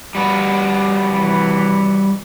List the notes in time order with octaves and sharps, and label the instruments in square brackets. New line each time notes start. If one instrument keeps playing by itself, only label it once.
[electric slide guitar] G3 F#4 B4
[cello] C3 E3